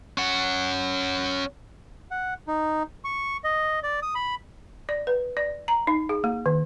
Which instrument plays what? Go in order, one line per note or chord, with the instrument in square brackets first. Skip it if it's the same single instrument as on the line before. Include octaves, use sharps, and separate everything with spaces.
[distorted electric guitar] C#4 F#5
[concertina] F#5
D#4
C#6
D#5
D5
D#6
B5
[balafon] D5
B4
D5
A#5
D#4
G#4
A#3
D#3